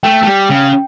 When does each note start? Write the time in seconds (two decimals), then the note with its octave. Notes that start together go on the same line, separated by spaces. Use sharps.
0.03 A3 G5
0.23 A3
0.27 G3
0.50 C#3